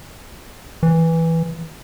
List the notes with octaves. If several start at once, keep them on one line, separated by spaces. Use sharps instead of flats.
E3